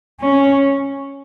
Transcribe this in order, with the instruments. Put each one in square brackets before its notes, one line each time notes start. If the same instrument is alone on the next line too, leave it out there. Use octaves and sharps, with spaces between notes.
[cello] C#4